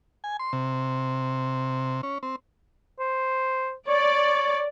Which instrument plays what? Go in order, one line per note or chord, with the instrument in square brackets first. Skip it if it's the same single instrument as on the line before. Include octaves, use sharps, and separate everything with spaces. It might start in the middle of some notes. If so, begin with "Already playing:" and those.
[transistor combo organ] G#5
C6
C3
C#4
C4
[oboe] C5
[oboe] C#5 [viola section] D5